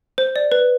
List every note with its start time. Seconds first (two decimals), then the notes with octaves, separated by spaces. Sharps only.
0.18 C5
0.36 D5
0.52 B4